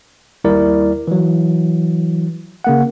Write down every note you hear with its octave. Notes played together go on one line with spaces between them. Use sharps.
D#2 G3 E4 A#4 D5
E3 F#3
C#3 A#3 F#5